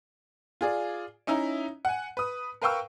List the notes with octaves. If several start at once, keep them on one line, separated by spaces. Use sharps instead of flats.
F4 G#4 D5
C#4 D#4 E4 E5 A#5
F#5 G#5
B4 D#6
A#4 B4 F5 G5 C#6 E6